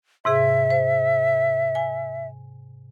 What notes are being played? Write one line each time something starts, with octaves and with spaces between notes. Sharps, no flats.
G#2 C3 G#4 E5
C5
G#5